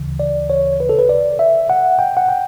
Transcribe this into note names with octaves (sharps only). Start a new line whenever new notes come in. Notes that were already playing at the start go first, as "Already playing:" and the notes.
Already playing: D2 C#3 E3
D5
C#5
B4
A4
B4
D5
E5
F#5
G5
F#5
G5